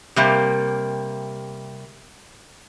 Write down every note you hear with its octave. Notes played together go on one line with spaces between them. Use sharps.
C3 G3 A#3